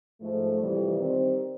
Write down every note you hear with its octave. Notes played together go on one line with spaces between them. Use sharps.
G#2 F3 A3
F2 C3 E3 G3
D#3 G3 C4